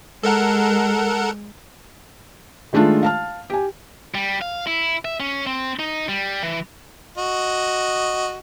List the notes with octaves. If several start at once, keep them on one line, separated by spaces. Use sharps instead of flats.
G#3 A4 A#4 F#5
D#3 G#3 A3 D4 F4
F5 A5 F6
G4 G#5
G3
F5
E4
E5
C#4
C4
D#4
G3
E3
F#4 D#5